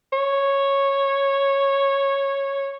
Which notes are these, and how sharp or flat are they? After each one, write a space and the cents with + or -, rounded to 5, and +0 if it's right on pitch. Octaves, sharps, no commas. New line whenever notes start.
C#5 -10